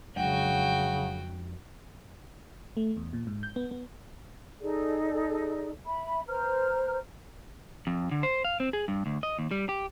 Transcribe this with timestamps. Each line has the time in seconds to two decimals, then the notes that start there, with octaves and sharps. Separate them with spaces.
0.16 F2 C#3 F#3 G#3 D4 F#4 F#5 G5
2.77 A3
2.97 E2
3.13 A#2
3.27 G#2
3.43 G6
3.56 B3
3.71 B3
4.61 D#4 G#4 A4 D5
5.85 E5 B5
6.27 B4 C5 A#5 F6
7.87 F2
8.11 D3
8.23 C5
8.44 F5
8.60 C4
8.73 G#4
8.88 G2
9.06 D2
9.23 D#5
9.39 D#2
9.51 G3
9.69 G4